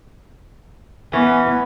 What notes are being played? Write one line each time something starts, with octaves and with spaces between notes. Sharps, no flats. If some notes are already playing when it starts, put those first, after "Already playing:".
E3 B3 C#4